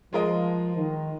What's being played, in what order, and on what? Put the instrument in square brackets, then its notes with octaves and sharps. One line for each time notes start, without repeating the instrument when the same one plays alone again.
[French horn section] F3 [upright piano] G#3 F4 A#4 D#5
[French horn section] D#3